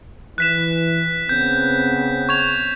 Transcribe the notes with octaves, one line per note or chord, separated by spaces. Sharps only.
E3 F#6 B6 E7
C#3 B3 C4 G6
C#6 G#6 F7